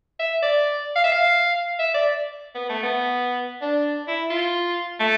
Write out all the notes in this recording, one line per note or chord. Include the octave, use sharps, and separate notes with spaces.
E5
D5
F5
E5
F5
E5
D5
B3
A3
B3
D4
E4
F4
A3